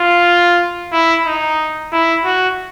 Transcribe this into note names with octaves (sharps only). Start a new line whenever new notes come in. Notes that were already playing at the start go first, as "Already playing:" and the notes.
Already playing: F4
E4
D#4
E4
F#4